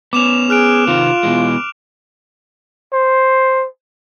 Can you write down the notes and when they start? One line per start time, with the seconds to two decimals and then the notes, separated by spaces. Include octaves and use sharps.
0.13 B3 C#4 D6 E7 F7
0.50 G#4 F6 F#6 D7
0.87 C3 D#3 C4 F4 F7
1.23 B2 E3 G#3
2.92 C5